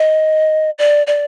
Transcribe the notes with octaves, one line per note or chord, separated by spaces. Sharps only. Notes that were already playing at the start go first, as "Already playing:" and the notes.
Already playing: D#5
D5
D5